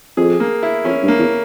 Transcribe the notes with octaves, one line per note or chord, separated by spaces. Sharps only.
F2 G#4
A#3
E4
F2 C#4
G2
A#3
E2